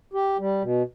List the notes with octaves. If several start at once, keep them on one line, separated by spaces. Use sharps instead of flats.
G4
G3
B2